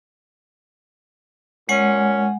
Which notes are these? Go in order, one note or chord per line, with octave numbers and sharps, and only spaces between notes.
A#2 G#3 C#4 F#5 G#5